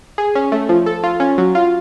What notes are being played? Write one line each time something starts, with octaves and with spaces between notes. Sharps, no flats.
G#4
C#4
A3
F3
A4
F4
C#4
F#3
F4